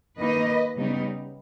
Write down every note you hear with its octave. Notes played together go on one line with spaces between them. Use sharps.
D#3 A#3 D#4 B4 D#5
C#3 G3 B3 D#4